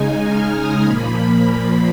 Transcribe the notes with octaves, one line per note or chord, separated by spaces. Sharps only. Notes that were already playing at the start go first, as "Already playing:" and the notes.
Already playing: C#3 G#3 D#4 G#5
F6
D#6
A#2 F3 A#3 B5
B5